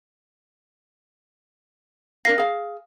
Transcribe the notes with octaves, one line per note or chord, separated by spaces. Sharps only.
D4 A#4 F5 A#6 C7
G#4 F5